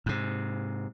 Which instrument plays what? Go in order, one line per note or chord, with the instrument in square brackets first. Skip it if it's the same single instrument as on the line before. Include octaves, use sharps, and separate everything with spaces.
[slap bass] G#2 C3